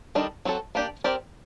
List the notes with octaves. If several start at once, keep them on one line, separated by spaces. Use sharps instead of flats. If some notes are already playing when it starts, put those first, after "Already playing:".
D#3 G3 D4 A4 D#5
F#3 C4 F#4 A4
A#3 D4 G4 D5
C4 G4 A#4 D5